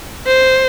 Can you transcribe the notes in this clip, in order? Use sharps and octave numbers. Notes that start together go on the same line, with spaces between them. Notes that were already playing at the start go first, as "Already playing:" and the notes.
C5